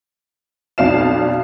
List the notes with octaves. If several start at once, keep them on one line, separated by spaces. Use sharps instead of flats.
B1 F2 D5 F5 E7